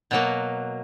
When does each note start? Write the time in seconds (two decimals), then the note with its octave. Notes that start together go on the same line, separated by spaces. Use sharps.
0.11 B2 F#3 A#3